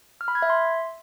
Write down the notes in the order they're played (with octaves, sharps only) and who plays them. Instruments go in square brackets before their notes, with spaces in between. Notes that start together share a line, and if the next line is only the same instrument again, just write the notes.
[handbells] F6
B5
G#6
E5
C6